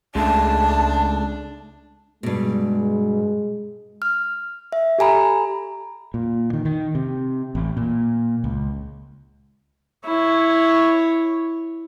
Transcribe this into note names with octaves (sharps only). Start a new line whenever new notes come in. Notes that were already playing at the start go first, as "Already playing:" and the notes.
C#2 C#3 G#3 A3 D4 A5
G2 B2 G#3
F6
E5
G4 A4 G#5 A#5 B5
A#2
D#3
D#3
C3
A1
A#2
C#2
E4 C#5